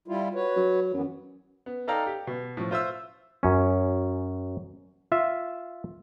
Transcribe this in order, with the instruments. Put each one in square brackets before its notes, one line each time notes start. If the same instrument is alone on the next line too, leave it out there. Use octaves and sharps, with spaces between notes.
[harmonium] G3 E4 F4
F#4 B4 C#5
[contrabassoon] F#3
[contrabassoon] F#2 [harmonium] D#3 E3 B3
[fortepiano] B3
D#4 A4 D5 F5 G5 A#5
G4
B2
A2 F3
F4 C5 E5 E6
[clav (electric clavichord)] F#2 C#4
F4 E5